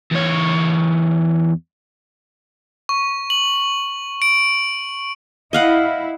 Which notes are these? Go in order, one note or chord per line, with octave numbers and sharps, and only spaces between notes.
E2 C#5
C#6
F#7
D7
E4 D#5 F5 F#5